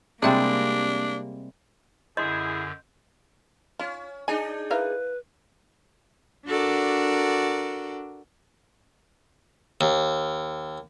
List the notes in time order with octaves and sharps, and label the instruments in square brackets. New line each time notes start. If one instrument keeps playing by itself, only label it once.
[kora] C3 G3 G#3 [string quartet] A#3 [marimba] C4 E5 G5 [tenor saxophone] D4
[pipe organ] F#2 D3 [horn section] E4 G#4 [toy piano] D#5 C6 [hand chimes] G6
[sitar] C#4 [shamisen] F4
[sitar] D4 D#4 G#4 [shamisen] G#5
[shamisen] E4 A#4 F5 [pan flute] B4
[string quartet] D4 F#4 A4 A#4 D5
[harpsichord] D#2